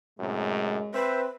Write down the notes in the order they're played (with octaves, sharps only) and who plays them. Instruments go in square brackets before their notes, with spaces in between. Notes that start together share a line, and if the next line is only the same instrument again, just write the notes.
[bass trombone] F#2 [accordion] A2 C3 [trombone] G#3
[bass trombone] C4 [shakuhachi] B4 [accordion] C5 E5